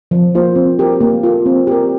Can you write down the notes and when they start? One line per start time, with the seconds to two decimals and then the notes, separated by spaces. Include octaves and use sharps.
0.11 F3
0.35 A#3 F4 C5
0.56 C4
0.79 G4 A#4
1.00 A#3
1.23 F4 A4
1.46 C4
1.67 G4 A#4